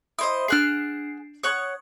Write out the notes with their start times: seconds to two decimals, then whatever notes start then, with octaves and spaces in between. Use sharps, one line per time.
0.19 E4 C5 D#5 D#6
0.48 D4 G#4 F#5 F6 C7
1.43 C#5 F#5 C#6 D#6